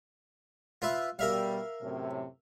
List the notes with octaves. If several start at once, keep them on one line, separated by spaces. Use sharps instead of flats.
F4 B4 E5
B2 G3 A#4 E5 F5
F#2 A2 C3